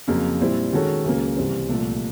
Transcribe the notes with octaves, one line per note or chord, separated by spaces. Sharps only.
F2 C#3 F#3 A#3
A#2 G3 C4 E4
D#3 G#3 C#4 F#4 A4
C#2 C#3 F#3 A#3
C2 C3 E3 G3 C4
C2 A#2 F3 A3